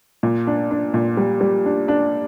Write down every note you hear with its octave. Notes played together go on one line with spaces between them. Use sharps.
A#2
D4
D4
A#2
G3
G3
D4
D4